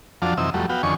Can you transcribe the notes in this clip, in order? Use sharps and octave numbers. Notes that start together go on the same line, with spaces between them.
F2 F3 F#3 D4 F5 A5
F#2 C3 E3 D#4 E6
F2 F#3 G3 A3
B3 F#4 F5 G5
F2 D3 D#3 C#4 G#5 C#6